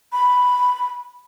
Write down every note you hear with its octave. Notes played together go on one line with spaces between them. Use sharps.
B5